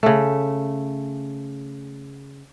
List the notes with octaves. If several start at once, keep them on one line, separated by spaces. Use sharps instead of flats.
C#3 A3